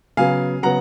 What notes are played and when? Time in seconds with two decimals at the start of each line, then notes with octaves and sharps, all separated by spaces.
0.17 C#3 F#3 B3 F5 G#5
0.63 C#3 F#3 B3 F#5 A#5